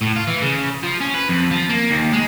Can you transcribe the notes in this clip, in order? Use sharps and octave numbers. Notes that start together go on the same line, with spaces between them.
A2
F4
E3
C#3
F3
C#4
B4
F2
F3
A#3
D#2
G#3